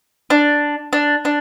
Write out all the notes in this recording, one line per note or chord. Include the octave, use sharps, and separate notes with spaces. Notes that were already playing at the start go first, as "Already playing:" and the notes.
D4
D4
D4